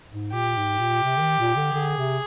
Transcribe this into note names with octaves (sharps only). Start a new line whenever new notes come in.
G#2
A#2 G4
G#2
A#2
C3
D3
D#3
A#2
D3
D3 G#4
C3